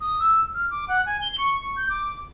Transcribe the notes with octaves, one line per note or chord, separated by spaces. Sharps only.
D#6
E6
F6
D6
F#5
G#5
G7
C#6
G6
D6